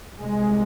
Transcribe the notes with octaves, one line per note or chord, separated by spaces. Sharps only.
C2 C3 G#3